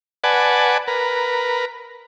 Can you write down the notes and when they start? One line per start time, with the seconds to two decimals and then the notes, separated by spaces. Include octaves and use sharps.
0.24 B4 D5 F#5 G#5 A5
0.88 A#4 B4